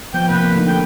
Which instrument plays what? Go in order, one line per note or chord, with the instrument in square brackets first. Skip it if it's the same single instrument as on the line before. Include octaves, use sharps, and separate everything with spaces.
[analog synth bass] F3 [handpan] B3 [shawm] G5
[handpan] C3 A#3 F#5 [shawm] B4
[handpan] D3 A3 D#4
[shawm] G5